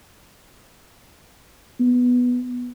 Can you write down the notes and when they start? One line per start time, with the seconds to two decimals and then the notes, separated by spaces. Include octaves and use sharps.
1.80 B3